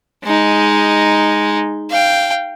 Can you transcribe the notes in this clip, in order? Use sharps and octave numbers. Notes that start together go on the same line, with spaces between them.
G#3 D#4
F5 G5